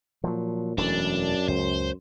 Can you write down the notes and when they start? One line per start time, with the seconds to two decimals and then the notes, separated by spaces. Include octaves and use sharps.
0.24 A#2 F3 F#3
0.78 E1 F#2 E3 A3 D4
1.48 C#2 C5